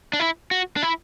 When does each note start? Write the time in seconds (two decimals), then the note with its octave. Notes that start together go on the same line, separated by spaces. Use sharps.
0.13 D4
0.20 E4
0.51 F#4
0.76 D4
0.83 E4